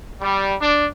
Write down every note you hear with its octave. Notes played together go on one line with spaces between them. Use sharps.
G3
D4